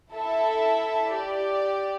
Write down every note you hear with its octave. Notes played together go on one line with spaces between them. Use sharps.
E4 A4 E5
G4 D5